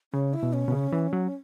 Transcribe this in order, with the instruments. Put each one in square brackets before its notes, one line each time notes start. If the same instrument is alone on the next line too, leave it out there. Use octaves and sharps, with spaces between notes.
[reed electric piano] C#3 [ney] C#4
[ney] E4
[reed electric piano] B2
[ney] C#4
[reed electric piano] B2
C#3
E3
F#3